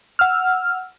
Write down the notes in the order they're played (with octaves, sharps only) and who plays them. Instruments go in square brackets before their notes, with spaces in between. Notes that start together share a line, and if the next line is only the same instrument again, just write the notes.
[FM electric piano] F#5 E6 F6